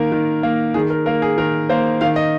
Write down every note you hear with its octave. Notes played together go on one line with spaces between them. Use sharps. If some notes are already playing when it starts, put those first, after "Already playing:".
Already playing: D#3 A#3 A#4
D#3
A#3
D#3 G#4
A#4
A#3 A#4
G#4
D#3 A#4
A#3 C5
D#3 F5
D#5